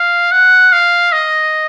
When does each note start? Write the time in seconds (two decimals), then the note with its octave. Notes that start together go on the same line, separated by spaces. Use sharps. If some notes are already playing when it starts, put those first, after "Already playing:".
Already playing: F5
0.32 F#5
0.72 F5
1.12 D#5